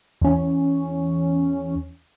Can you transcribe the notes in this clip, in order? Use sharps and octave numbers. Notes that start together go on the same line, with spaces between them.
E2 C#4